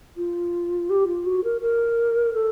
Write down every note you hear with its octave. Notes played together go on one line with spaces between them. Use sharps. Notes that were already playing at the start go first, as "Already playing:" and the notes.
F4
G4
F4
F#4
A#4
A#4
A4